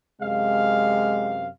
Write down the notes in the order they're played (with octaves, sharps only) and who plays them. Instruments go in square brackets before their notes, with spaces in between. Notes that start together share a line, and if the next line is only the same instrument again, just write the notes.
[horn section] F#2 C3 F5 [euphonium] G#3